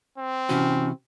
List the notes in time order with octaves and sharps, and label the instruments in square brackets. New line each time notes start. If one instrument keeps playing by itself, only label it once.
[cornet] C4
[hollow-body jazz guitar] C3 E3 F#4 [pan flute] C#4